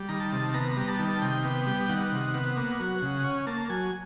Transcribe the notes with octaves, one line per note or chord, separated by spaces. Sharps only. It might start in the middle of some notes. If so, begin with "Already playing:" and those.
Already playing: G3
D#3 A#5
A5
C3
B3 A#5
A#5
G3
A5
D#3
A5
C3 G5
B3
G3
D#3 F#5
C3
B3
A#3
F#3
C#3
C#4
A#3 A5
F#3 G#5